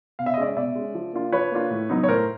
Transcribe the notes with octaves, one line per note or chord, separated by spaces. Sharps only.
B2 F5
E5
D#5
G#3 C#4 D5 E5
B2 D5 E5
G#3 C#4
F3
A#3 D4 F4
F3 B4 C#5
A#3 D4 F4
A2
F#3 B3 D#4
C#5
A2 A#4 C5